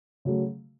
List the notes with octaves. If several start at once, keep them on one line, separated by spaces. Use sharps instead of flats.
C#3 F#3 A3